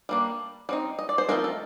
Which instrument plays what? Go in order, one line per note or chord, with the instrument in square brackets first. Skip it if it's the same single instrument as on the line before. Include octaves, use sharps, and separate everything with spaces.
[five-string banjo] G3 A#3 D4
G3 C4 D#4
D#5
D5
C5
F3 A3 C4 D#4 A#4
A4